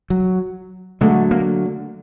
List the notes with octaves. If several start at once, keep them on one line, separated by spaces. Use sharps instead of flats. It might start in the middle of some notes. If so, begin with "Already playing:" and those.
F#3
D3 F#3 G#3 A3
A#3